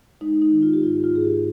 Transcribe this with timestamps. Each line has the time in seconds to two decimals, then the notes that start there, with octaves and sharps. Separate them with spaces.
0.21 G#3 D#4
0.42 D#4
0.51 D#3
0.62 F4
0.73 G4
0.83 G#2 F4
1.04 F4
1.13 G#2 G#4
1.25 G4